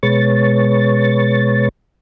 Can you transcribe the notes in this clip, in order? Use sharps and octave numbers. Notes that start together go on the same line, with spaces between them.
B2 G#3 B4 C#5 C#6 A6